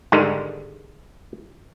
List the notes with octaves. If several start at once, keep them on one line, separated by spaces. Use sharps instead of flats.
G#2 D3 D#3 G3 G#3